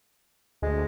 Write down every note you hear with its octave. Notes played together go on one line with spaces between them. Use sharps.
D2 G#3